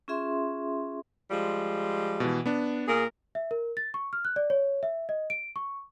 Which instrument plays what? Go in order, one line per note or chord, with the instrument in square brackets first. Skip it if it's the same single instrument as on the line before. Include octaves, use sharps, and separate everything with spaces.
[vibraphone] C#4 F4 G#4 E5 C6
[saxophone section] F3 G3 G#3
[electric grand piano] B2 E3
B3 D4
[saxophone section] A#2 G#4 A#4
[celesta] E5
A#4
A6
C#6
F6
F#6
D5
C#5
E5
D#5
D7
C#6